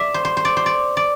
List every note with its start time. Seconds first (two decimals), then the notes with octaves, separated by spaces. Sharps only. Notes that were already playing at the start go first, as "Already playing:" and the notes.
Already playing: D5 E5
0.14 C5
0.25 C5
0.37 C5
0.45 D5
0.57 C5
0.66 D5
0.97 D5